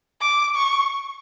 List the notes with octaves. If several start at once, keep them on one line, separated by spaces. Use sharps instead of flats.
D6
C#6